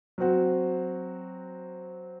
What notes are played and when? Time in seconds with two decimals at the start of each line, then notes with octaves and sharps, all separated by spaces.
0.18 F#3 C4 F#4